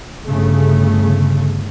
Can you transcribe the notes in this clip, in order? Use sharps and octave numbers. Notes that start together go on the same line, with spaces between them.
G1 C#3 A3